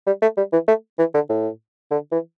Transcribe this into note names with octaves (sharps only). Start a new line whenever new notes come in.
G3
A3
G3
E3
A3
E3
D3
A2
D3
E3